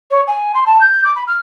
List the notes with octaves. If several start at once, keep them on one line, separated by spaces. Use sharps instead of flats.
C#5
G#5
C6
A5
G6
D6
B5
F6